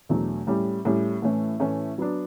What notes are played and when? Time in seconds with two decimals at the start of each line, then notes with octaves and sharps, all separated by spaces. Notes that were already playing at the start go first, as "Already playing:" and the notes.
0.09 E2 B2 F#3 A3 D4
0.47 A2 G3 C#4 G4
0.85 A2 G3 C#4 G4
1.22 A2 E3 A3 C#4
1.60 A2 E3 A3 C#4
1.98 F#3 B3 D4